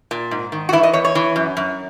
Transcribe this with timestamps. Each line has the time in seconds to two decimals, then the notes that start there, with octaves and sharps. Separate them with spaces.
0.11 A#2
0.31 G#2
0.52 D#3
0.69 F#4
0.73 E3 E4
0.83 D#5
0.93 E2 C#5
1.05 C#5
1.15 E3
1.36 F#2
1.57 F#2